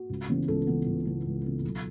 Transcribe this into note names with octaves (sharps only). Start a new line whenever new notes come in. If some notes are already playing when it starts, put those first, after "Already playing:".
Already playing: F#4
C#2
C#3 E3 B3
C#2 A4
C#3 E3 B3
C#2
C#3 E3 B3
C#2
C#3 E3 B3
B1